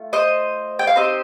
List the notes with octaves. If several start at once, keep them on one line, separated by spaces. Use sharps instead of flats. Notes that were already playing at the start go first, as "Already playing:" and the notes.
Already playing: A3 F4
C5 D#5
G5
F5
C4 D#4 G4 C5 D#5